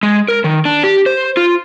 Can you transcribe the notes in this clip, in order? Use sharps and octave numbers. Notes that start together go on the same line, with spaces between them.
G#3
A#4
D#3
D4
G4
C5
F4